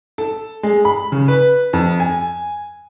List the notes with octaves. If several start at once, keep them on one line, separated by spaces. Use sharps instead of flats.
A4
G#3
B5
C#3
B4
F2
G#5